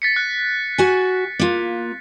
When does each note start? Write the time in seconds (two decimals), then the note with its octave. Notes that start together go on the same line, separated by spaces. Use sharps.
0.02 A6 B6 C#7
0.16 F#6
0.78 F#4 G#5
1.39 A#3 F4